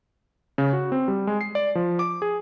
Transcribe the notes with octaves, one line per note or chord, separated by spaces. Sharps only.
C#3
F#4
C4
G3
G#3
C7
D5
F3
D6
G#4